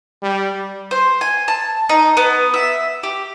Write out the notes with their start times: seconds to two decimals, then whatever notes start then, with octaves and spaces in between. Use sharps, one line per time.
0.23 G3
0.91 C5
1.21 G#5
1.48 A5
1.89 D#4
2.17 B3
2.54 E5
3.03 G4